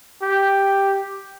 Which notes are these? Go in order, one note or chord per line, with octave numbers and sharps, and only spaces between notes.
G4